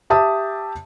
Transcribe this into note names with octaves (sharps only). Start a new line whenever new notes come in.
G4 E5 A5 D#6